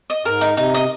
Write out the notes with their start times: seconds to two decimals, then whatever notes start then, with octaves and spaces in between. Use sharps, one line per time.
0.10 D#5
0.25 G#2 A#4
0.41 D#4
0.57 C3 D#4
0.74 D#5